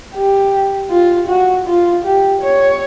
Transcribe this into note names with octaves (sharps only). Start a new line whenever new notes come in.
G4
F4
F#4
F4
G4
C#5